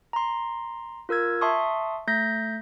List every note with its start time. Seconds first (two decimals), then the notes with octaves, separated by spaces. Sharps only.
0.13 A#5 C6
1.09 F4 A#4 E6 G#6
1.41 E5 A5 C6 C#6 D#6
2.07 A3 G6 A#6 B6